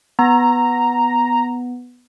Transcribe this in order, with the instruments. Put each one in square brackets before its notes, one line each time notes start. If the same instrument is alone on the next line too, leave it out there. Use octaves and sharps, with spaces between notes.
[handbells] B3 [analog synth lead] A#5